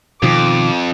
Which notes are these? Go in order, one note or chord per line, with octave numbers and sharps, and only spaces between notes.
F2 B2 D#3 F3 D6